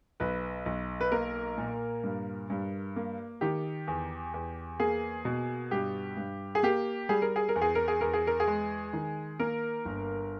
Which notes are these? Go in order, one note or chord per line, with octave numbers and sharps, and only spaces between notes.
B1 B4
B1
B4
A#3 A#4
A#2
G2
G2
A#3
D#3 G4
E2
E2
A#3 G#4
B2
G2 G4
G2
G#4
A#3 G4
G3 G#4
A#4
G#4
A#4
E2
G#4
A#4
G#4
E2 A#4
G#4
A#4
G#4
G#3
D#3
A#3 A#4
G1